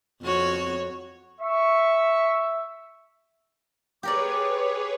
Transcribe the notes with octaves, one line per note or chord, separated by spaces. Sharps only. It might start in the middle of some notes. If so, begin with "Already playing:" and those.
F2 F#4 C#5
E5 C#6
G4 G#4 A#4 B4 C#5 D5 D6